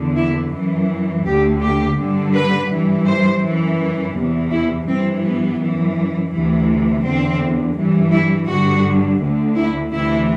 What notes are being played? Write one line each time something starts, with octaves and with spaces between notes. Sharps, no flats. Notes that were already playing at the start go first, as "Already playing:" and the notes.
Already playing: E2 D3
E4
F#2 E3
D2 D3 G4
G4
G2 D3
B4
G2 E3
C5
F#2 E3
E2 C3 E3
E4
G2 E3 C4
B3
F#2 E3
D2 C3 E3
E2 D3 C4
G2 E3
E4
G2 D3 F#4
D2 D3
E4
D2 C3 E3 E4